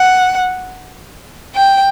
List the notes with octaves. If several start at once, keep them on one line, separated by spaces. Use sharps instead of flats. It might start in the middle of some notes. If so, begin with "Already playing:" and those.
Already playing: F#5
G5